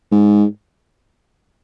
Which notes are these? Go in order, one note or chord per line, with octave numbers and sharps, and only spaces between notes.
G#2